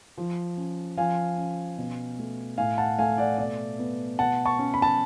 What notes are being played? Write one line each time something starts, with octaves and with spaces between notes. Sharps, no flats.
F3
C#4
F3 F5 G#5
C#4
B2
A3
A2 F5 G#5
F#5 A5
A3 F5 G#5
D5 F#5
B2 D5
B3
B2 F#5 A5
A5 C#6
C#4
B5
A5